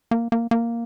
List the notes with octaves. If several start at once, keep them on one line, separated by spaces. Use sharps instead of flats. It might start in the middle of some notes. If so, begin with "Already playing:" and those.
A#3
A#3
A#3